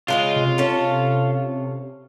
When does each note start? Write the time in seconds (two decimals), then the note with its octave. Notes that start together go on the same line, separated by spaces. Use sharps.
0.08 C#3 G#3 F4 D#5
0.36 C3
0.58 C#4 A4